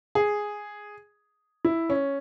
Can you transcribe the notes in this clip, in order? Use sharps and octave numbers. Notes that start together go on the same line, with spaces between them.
G#4
E4
C#4